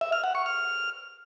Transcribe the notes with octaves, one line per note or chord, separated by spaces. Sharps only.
E5
F6
F#5
C#6
F6